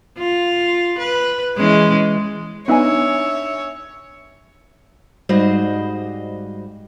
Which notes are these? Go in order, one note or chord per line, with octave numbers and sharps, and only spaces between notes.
F4
B4
E3 G#3 C#4
B3 D4 D#4 C#5 E5 G#5
G#2 G3 F#4 C5 D#5 F5